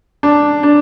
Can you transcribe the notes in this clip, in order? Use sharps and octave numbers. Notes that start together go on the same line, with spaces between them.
D4
D4